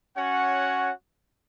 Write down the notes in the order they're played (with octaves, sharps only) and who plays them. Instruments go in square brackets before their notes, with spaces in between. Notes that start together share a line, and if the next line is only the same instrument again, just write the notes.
[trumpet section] C#4 F#4 C#5 F#5